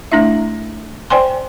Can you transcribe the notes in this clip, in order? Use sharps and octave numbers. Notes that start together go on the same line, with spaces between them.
A3 D4 E4 E5
C5 D5 G5 G#5 C6